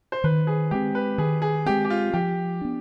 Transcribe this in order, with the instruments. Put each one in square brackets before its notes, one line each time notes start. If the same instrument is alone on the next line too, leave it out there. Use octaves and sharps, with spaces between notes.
[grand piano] C5
[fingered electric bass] D#3 [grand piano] B4
[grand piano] G#4
[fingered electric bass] G#3 C4 [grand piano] G4
[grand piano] B4
[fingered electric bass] D#3 [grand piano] G#4
[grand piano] G#4
[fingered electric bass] G#3 C4 [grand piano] G4
[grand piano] G4
F4
[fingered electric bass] F3 [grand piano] G4
[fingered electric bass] B3 D4